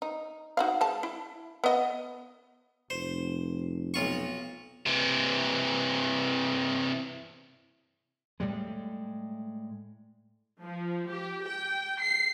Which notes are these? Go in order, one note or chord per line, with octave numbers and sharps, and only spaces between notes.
D#4
D#4 F#4 F5
G#3 A5
E4
B3 D#5
F1 C5
B1 F4 C#6
C3 E3
A2 G3 G#3
F3
G4
G5
C7